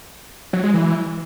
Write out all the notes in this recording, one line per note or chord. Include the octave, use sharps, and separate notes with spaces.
F#3
G#3
E3